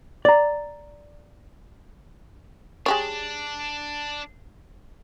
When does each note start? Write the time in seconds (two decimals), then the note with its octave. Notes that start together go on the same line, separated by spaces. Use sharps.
0.25 D5 A#5
2.86 G#3 D4 G4 C#5